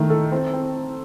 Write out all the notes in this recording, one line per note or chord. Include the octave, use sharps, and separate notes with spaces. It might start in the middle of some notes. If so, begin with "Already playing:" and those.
Already playing: D#3 A3
A4
C4
C4